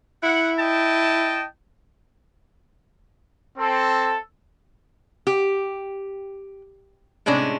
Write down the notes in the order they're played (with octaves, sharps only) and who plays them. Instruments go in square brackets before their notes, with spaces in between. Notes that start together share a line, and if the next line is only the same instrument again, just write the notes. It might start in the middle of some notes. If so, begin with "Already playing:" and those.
[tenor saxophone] E4 [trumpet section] F#5
[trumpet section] D#5 G5 A5
C4 A4
[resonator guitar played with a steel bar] G4
A2 C3 G#3 C#4 D4